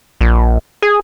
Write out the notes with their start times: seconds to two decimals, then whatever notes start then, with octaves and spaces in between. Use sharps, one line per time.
0.21 A#1
0.82 G#4